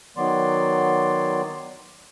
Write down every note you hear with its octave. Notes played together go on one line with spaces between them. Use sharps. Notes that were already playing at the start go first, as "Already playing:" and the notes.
D#3 F#3 B3 D5 C6